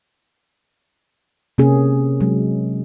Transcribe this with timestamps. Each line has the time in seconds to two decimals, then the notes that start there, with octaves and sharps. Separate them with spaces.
1.58 C3 A#3 C#4 G#4
2.20 F#3 G#3